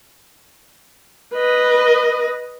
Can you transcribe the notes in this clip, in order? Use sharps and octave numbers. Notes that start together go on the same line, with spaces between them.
B4 D#5